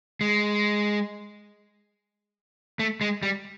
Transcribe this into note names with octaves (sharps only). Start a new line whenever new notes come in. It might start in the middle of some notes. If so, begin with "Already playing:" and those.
G#3
A3
G#3
G3